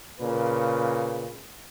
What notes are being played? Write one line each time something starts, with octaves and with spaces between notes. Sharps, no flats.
A#2 C#3 B4